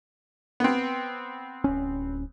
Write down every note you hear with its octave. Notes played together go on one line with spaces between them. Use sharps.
B3 C4
D1 C#4